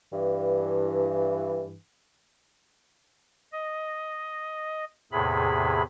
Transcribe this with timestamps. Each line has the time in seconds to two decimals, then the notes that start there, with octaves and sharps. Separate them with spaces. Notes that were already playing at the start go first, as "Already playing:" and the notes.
0.13 G2 E3
3.52 D#5
5.12 E2 A2 C3 G#4 B5